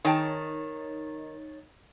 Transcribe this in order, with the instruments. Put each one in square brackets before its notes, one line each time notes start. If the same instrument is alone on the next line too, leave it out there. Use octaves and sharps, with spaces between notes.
[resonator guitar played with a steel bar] D#3 [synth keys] D#4 C#5 A6 [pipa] G#4 G5 A5